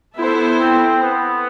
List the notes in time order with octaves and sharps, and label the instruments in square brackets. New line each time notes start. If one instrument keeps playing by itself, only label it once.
[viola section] B3 E4 A4 C5
[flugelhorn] C4
B3